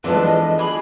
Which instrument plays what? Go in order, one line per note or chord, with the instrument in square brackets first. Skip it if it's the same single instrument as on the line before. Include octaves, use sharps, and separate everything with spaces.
[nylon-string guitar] E3 G#3 [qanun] F3 B3 [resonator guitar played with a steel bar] C4 D4 A4 [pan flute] B4
[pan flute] D#5
[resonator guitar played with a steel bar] G4 G#4 [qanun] G#5 [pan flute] B5